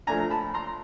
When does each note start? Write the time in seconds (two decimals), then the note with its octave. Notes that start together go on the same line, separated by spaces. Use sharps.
0.07 F3 A3 D4 G#5 A#5
0.30 A5 B5
0.54 A#5 C6